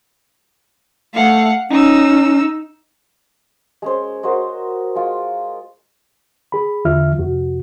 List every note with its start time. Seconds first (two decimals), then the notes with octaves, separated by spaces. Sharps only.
1.14 A3 F5 F#5
1.70 C#4 D#4 E6
3.82 G#3 C#4 C5
4.23 F#4 A#4 C5 D#5
4.95 G#3 F4
6.52 G#4 B5
6.85 E2 D3 F4 E5 F6
7.18 F2 C3 F#4